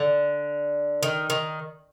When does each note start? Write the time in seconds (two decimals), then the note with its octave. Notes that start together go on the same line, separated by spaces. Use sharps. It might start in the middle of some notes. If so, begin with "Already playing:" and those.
Already playing: D3
1.03 D#3
1.30 D#3